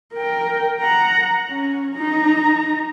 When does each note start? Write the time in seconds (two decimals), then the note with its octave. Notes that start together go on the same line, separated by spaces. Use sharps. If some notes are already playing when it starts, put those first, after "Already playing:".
0.13 A#4 G5
0.80 F#5 A#5
1.49 C#4
1.96 D#4 A#5